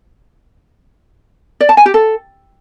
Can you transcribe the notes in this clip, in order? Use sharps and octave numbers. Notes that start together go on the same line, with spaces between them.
D5
A5
G#5
G4
A4